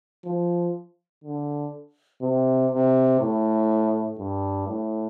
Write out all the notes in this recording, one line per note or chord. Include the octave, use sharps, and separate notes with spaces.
F3
D3
C3
C3
A2
G2
A2